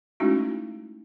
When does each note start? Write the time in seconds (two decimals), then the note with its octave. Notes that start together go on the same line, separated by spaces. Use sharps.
0.20 G#3 A3 C#4 D#4 E4 F#4